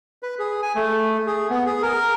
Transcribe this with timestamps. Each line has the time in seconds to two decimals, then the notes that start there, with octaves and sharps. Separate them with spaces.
0.23 B4
0.39 G#4
0.62 G#5
0.75 A3
1.27 G#4
1.50 B3
1.66 G#4
1.82 A#4